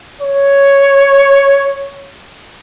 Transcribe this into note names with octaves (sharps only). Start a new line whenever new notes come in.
C#5